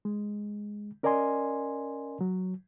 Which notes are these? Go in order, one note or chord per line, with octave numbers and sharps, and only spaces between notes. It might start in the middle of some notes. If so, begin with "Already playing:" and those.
G#3
C#4 A#4 D5 D#5 G#5 C6
F#3